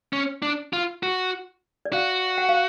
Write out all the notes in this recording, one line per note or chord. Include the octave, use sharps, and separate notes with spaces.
C#4
D4
F4
F#4
D5
F#4 F5
F#5
F5